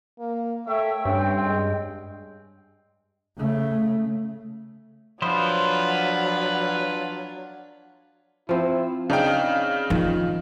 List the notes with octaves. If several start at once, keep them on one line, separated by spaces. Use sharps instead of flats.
A#3
A3 C#5 E5 G5
G2 C4 C#4
G#3
C#3 A3
F3 F#3 D4 E4 F4 B4 C5
F3 C4 E4
C#3 D4 D#4 F5 G5
D#3 F3